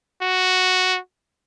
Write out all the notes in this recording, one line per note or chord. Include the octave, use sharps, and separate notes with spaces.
F#4